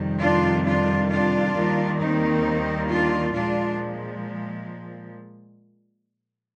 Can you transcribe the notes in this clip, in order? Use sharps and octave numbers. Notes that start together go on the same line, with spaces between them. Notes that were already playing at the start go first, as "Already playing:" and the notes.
Already playing: F2 C3 D#3 G3
D4 F4
D4 F4
D4 F4
D#2 D#3 G3 A#3
C4 D#4
D4 F4
A#2 F3 G#3 D4 F4